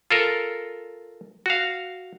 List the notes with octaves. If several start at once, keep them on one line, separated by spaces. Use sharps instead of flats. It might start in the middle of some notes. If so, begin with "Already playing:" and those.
F4 A4 A#4
F#4 F5